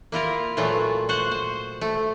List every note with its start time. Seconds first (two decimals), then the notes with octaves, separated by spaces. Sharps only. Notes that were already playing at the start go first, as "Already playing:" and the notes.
0.12 A#3 E4 F4 A#4
0.57 A#2 E3 F#3 A3 F4
1.09 F#4 C5 F#5
1.31 C5
1.81 A3